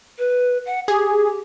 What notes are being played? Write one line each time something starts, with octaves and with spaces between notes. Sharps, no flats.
B4
F#5
G4 G#4